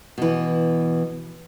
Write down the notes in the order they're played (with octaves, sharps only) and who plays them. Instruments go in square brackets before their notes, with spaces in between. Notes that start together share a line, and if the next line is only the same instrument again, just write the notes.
[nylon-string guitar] B2 E3